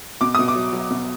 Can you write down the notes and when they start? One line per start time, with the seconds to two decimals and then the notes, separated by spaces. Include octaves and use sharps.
0.21 B2 D6
0.35 B2 D#6
0.48 D6
0.55 F#3
0.73 F#3
0.91 B2